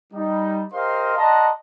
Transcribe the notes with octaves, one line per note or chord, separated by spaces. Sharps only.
G3 D#4
G4 A#4 C5 D#5 F5 C6
D5 D#5 F#5 A5 A#5 C6